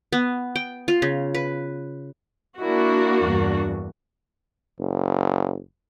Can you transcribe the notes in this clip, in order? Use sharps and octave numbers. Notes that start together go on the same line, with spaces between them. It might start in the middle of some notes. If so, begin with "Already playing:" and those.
B3
G5
F4
C#3
B4
A#3 D4 E4 F#4
E2 G2
F#1